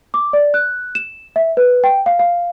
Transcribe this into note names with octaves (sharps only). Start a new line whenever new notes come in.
D6
D5
F#6
E7
E5
B4
G5
F5
F5